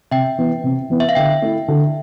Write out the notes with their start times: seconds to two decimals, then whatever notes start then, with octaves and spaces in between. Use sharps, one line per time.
0.11 C3 E5 G5
0.38 E3 B3
0.64 C3
0.90 E3 B3
1.00 E5
1.09 F5
1.15 D3 E5 G5
1.42 A3 E4
1.68 D3